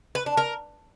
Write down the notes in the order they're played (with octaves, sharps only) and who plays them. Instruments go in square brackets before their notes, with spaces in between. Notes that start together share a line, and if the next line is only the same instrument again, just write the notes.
[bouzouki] B4
D4
A#4